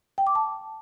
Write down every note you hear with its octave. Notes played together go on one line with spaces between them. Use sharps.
G5
D6
A5